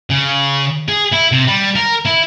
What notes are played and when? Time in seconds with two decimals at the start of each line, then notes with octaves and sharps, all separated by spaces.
0.10 C#3
0.89 G#4
1.12 E4
1.32 C3
1.47 G3
1.76 A#4
2.06 E4